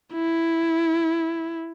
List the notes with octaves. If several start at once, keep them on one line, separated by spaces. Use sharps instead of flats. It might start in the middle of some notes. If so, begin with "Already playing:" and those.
E4